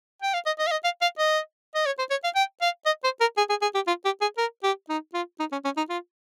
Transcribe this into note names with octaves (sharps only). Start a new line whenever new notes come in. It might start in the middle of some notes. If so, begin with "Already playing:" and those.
G5
F5
D#5
D#5
F5
D#5
F5
F5
D#5
D#5
C#5
C5
C#5
F5
G5
F5
D#5
C5
A#4
G#4
G#4
G#4
G4
F4
G4
G#4
A#4
G4
D#4
F4
D#4
C#4
C#4
D#4
F4